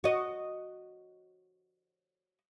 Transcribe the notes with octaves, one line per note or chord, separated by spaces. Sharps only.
F#4 D#5